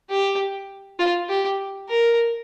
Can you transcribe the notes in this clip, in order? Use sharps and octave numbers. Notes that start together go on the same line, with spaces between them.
G4
F4
G4
A#4